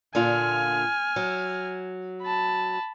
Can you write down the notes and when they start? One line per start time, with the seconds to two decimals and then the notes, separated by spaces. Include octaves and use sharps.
0.15 A#2 D3 F4 G#5 F6
1.16 F#3
2.23 A5 B5